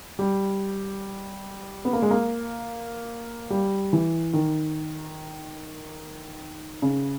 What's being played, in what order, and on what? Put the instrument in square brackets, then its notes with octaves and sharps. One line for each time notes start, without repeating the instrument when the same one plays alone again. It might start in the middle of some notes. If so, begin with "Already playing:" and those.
[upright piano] G3
B3
A#3
G#3
A#3
G3
E3
D#3
C#3